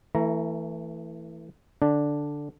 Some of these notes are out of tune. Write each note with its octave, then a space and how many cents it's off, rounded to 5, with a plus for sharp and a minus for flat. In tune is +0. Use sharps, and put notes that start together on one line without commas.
E3 +0 A3 +30 A#5 +5
D3 +0 D4 +0